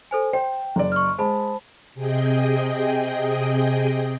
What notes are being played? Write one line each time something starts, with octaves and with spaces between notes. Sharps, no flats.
A4 C5 G#5
C5 G5
F#1 D5
C#6 F6
G#3 C5 A5 B5
C3 G#4 D#5 G5